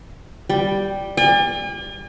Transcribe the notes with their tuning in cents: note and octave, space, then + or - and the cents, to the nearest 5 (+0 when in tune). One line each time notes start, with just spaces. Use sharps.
G3 +0 G5 +0
D5 +10 G#5 -45